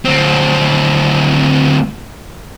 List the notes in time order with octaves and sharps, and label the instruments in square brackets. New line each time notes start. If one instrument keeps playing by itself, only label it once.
[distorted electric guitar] D2 C4